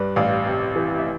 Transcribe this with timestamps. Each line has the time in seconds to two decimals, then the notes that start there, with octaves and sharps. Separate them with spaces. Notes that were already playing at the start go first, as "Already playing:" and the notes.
Already playing: G2 B4 D5
0.16 A1 D5 F5
0.46 C3
0.76 E3
0.98 E5